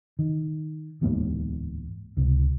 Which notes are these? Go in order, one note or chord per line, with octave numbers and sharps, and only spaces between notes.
D#3
D1 E2 G#2 A#3
C#2 C3